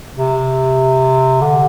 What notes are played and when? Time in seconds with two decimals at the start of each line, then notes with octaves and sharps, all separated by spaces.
0.15 C3
1.41 D3